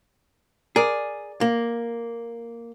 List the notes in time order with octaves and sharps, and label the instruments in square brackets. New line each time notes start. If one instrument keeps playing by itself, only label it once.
[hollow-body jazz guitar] G#4 [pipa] A#4 D5
[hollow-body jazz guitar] A#3